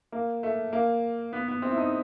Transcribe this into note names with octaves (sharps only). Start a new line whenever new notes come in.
A#3
A3
A#3
B3
B3
C4
E4
D#4